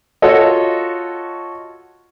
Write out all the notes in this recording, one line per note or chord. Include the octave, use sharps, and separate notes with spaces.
F4 F#4 A4 C#5 D#5